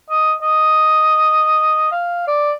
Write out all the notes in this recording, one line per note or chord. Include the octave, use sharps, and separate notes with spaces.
D#5
D#5
F5
D5